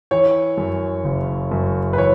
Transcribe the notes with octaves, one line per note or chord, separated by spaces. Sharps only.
E3 C#5
F#2
F#1
F#2
B4
E3 C#5